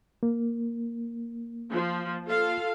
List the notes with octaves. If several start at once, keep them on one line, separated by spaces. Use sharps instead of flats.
A#3
F3
F4 A4 F5